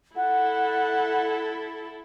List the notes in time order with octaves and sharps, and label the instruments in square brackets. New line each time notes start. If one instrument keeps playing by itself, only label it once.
[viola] E4 A4 [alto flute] F#5